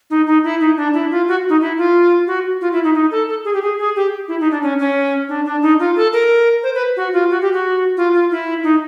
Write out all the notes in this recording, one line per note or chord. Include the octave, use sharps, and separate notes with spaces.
D#4
D#4
E4
D#4
D4
E4
F4
F#4
D#4
E4
F4
F#4
F4
E4
D#4
D#4
A4
A4
G#4
G4
G#4
G#4
G4
E4
D#4
D4
C#4
C#4
D4
D4
D#4
F4
A4
A#4
C5
B4
F#4
F4
F#4
G4
F#4
F4
F4
E4
D#4